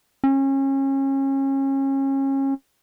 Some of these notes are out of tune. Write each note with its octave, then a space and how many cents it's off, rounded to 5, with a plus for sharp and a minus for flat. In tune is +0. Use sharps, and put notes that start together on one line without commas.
C#4 -30